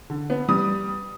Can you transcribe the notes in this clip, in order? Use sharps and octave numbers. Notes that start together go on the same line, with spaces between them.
D3
B3
G3 D#6